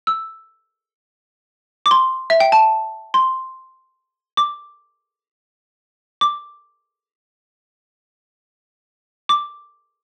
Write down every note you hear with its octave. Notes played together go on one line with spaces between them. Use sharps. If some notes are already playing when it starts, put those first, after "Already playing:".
E6
D6
C6
E5
G5
A5
C6
D6
D6
D6